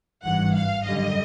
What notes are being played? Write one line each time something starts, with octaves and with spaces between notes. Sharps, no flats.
G#1 G2 E3 F#5
F5
F#2 D3 G3 D#5